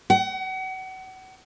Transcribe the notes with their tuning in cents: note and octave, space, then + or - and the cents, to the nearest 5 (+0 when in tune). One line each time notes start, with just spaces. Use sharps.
F#5 +35